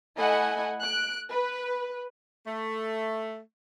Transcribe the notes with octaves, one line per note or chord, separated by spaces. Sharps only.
A3 E4 D#5 F#5 G#5 B5
F#6 D7
B4
A3